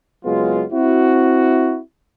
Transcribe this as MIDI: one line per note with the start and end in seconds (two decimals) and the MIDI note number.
0.25 0.64 30
0.25 0.64 54
0.25 0.64 56
0.25 0.64 59
0.25 0.64 65
0.72 1.79 60
0.72 1.79 64
0.72 1.79 66